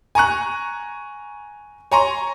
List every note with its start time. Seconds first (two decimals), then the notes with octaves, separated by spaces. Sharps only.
0.15 G#5 A#5 C#6 F#6
1.92 C#5 G#5 A#5 C6 C#6